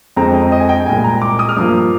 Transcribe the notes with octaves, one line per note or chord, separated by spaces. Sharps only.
F2 D3 G#3 C4 A#5
D#5
D#5
G#5
G5
C2 A#2 G#3 G#5
A#5
D6
D#6
F6
G2 F3 A#3 D#6